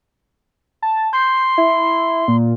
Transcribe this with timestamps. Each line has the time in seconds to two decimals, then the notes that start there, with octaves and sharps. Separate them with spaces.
0.82 A5
1.13 C6 G6
1.58 E4
2.28 A#2